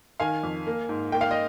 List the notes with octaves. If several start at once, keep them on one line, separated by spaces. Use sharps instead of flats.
D#3 F5 G#5
F2
A#3
G#2
A#3 G5
F5
D#5